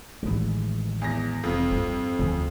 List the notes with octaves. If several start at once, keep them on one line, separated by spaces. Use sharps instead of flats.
A1 D#3 E3 G#3
E2 A#6
F1 F2
G2
D2 C#3 E3 F3